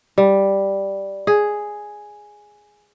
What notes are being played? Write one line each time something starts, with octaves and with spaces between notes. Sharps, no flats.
G3
G#4